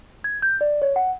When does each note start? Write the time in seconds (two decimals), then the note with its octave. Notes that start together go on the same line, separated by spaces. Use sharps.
0.24 G#6
0.42 G6
0.61 D5
0.82 C#5
0.96 F#5